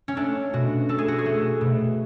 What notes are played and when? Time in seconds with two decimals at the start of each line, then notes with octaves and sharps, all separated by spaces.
0.08 C#4
0.17 A3 D4
0.53 B2 F#4
0.89 A3 A4
0.99 G#4
1.08 F#4
1.18 G#4
1.26 A3
1.61 B2